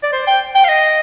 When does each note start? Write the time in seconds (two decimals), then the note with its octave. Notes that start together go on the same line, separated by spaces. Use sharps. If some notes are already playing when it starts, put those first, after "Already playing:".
0.03 D5
0.13 C5
0.27 G5
0.55 G5
0.64 F5
0.69 D#5